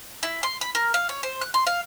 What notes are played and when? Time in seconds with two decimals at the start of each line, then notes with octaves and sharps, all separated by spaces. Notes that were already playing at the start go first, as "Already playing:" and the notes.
0.23 E4
0.43 C6
0.61 B5
0.75 A#4
0.94 F5
1.09 C#5
1.23 C5
1.41 F#6
1.54 C6
1.67 F5